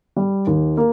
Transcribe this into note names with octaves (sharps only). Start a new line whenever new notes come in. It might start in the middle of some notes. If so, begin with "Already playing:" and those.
G3
D#2
A#3